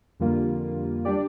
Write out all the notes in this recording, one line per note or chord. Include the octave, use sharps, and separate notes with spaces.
F2 D3 G3 A#3 F4
G3 D4 G4 D5